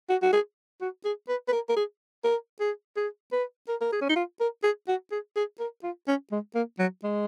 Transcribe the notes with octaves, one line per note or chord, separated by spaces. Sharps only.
F#4
F#4
G#4
F#4
G#4
B4
B4
A#4
A#4
G#4
A#4
G#4
G#4
B4
A#4
A#4
G#4
C#4
D#4
F4
A#4
G#4
F#4
G#4
G#4
A#4
F4
C#4
G#3
A#3
F#3
G#3